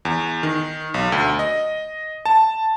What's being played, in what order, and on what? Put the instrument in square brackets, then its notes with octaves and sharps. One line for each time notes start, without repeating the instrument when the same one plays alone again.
[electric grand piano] E2
D#3
B1
D2
D#5
A5